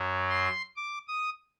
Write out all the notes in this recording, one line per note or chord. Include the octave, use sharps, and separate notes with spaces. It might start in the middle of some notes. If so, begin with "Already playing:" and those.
Already playing: F#2 F#3
C6
D6
D#6